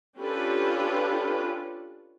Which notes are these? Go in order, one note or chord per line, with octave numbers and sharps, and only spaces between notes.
C#4 D4 F4 G4 A4 B4